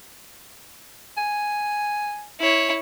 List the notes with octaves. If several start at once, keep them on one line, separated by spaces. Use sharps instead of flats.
G#5
E4 C#5